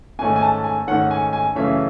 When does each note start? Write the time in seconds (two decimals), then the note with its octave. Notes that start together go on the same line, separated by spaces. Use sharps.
0.19 G#2 D#3 A3 C#4 G#5
0.36 G#5
0.42 A5
0.64 G#5
0.87 G#2 D#3 A3 C#4 F#5
1.11 G#5
1.33 G#5
1.55 F#2 C#3 E3 A3 C#4 E5